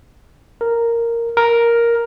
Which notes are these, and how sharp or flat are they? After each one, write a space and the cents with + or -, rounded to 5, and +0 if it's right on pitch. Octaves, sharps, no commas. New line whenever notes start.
A#4 -5
A#4 +5